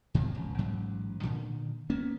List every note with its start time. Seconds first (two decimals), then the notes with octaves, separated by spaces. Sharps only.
0.14 G#2 C3 F3 F#3
0.35 E1 C#2
0.58 A1 G#2 F#3
1.22 A#2 D3 D#3
1.90 A#3 B3 C#4